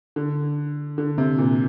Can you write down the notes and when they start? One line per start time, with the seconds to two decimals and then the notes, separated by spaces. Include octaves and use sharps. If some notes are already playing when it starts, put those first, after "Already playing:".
0.16 D3
0.98 D3
1.18 C3
1.38 A#2